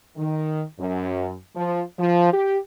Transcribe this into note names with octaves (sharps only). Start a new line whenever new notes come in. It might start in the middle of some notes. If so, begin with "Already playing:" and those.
D#3
F#2
F3
F3
G4